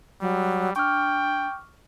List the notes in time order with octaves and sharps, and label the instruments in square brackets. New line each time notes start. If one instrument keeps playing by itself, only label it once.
[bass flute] F#3 [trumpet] G3
[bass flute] D4 [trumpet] G5 [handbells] C#6 D6 F6